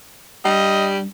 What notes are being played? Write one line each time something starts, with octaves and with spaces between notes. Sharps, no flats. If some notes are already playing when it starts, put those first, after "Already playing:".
G2 G3 D#5